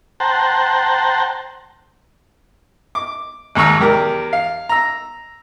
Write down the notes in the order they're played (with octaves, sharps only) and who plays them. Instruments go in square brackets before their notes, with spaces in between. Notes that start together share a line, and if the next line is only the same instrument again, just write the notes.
[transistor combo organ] C5 F#5 G5 A5 A#5
[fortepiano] D6
G#1 D#2 A#5 C#6 E6
E2 G4 A#4
F5
A#5 E6